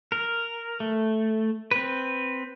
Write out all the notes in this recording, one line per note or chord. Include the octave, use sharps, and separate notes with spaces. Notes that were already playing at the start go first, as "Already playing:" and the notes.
A#4
A3
C4 B4